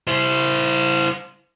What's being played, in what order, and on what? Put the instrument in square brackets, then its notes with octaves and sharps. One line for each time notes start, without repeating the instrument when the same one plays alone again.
[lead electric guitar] E4 C5